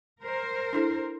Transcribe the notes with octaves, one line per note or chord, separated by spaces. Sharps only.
A#4 C5
D4 E4 A4